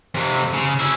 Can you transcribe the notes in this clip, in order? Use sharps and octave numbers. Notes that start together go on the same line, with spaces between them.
F2 C3
C#3
C#4 E4